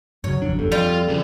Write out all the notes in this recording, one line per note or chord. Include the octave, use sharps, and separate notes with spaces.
G2 C#3 F#3 C#5
G#1 F2 D4
F#1 E2 G2 A4
F2 G3 F4
C#3 E3 F3